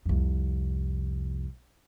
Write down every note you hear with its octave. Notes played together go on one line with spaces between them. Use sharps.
C2 F2